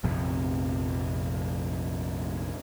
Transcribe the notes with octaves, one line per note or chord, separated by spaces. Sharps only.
A#1 F2 C3